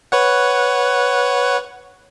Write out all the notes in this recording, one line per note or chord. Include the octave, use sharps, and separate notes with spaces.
B4 C#5 F#5